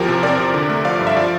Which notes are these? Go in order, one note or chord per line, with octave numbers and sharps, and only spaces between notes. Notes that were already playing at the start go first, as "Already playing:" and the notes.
Already playing: E2 F3 G4 A#4
C3
C4 A#4 D5
C3
D3
A3
F3 D5 F5
G2
E5
F3 D5 F5